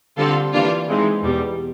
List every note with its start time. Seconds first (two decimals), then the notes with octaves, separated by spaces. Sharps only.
0.17 D3 G3 C4 F4 A4
0.53 E3 G3 A#3 D4 F4
0.88 E3 G#3 C4 D#4
1.23 E2 B2 G3